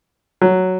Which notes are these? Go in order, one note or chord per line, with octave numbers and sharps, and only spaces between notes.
F#3